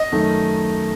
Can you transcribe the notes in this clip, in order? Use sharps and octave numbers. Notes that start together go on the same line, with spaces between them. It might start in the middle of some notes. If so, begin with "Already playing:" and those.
Already playing: D#5
F#2 D#3 A3 D#4